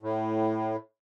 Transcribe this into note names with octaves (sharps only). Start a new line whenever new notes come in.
A2